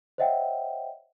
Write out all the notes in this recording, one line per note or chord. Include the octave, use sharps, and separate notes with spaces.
C5 C#5 D#5 E5 F#5 G5